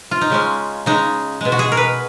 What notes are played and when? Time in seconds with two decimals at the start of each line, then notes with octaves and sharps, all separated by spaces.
0.11 F4
0.21 D#4
0.30 C#3 G#3 C#4
0.86 C#3 G#3 D#4
1.41 B2 G#3
1.52 F#4
1.59 G#4
1.72 A#4
1.77 B4